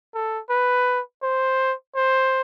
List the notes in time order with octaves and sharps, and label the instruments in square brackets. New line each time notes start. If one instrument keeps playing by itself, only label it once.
[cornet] A4
B4
C5
C5